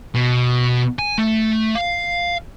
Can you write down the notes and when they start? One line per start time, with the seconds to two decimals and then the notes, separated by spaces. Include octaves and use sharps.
0.15 B2
0.99 G#5
1.18 A3
1.76 F5